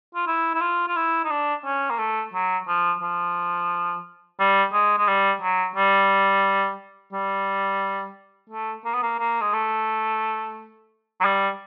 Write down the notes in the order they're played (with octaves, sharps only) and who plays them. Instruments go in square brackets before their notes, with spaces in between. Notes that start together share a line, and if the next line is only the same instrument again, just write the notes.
[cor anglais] F4
E4
E4
F4
F4
E4
D#4
D4
C#4
A#3
A3
F#3
F3
F3
G3
G#3
G#3
G3
F#3
G3
G3
A3
A#3
B3
A#3
A#3
G#3
A3
F#3
G3